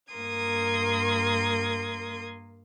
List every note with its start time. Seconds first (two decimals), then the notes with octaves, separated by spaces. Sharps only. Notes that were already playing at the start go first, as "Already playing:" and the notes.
0.13 G2 A#3 A#4 C6 D#6 G#6